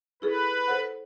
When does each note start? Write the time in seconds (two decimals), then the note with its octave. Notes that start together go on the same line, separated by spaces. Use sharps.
0.22 E4 G#4 A4 B4
0.68 A4 C5 F#5